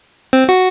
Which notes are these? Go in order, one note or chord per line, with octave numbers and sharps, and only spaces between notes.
C4
F#4